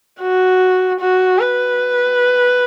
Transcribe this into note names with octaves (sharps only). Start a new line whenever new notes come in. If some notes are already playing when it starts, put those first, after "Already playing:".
F#4
F#4
B4